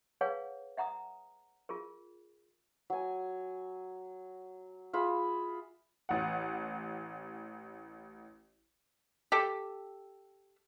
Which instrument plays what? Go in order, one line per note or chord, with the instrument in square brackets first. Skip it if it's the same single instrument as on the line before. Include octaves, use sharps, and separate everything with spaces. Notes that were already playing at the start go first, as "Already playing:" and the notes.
[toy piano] G#4 B4 C#5 F5 F#5 G#5
E5 F#5 A#5 D#6
F4 G#4 A#4
[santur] F#3 G#5
F4 G#4 E5 B5
[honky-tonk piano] A1 F#5
[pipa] G4 A4